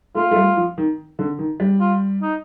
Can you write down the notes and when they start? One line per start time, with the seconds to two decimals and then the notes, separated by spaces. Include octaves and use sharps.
0.15 A3 F4
0.31 A3
0.36 G3
0.57 F3
0.78 D#3
1.19 D3
1.39 D#3
1.60 G3
1.81 F4
2.22 D#4